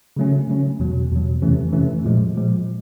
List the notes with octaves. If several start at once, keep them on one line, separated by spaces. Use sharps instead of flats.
C#3 F#3 A3 C#4
C#3 F#3 A3 C#4
E2 B2 F#3
E2 B2 F#3
F2 C3 E3 A3 C#4
F2 C3 E3 A3 C#4
A#2 F3 G#3
A#2 F3 G#3